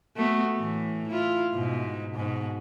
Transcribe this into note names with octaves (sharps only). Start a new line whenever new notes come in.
A3 B3 F#4
A2 E3
E4 F4
G#2 B2
G#2 B2